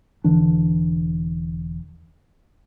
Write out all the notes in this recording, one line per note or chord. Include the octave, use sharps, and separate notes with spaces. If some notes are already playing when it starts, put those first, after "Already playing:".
E1 D3 E3 D4